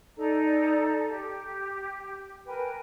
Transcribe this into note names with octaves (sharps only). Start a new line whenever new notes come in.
D#4 A4 D5 A#5
G4
A#4 B4 G5 G#5